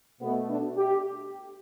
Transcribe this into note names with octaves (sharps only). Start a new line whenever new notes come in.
B2 A3 B3
D4
G4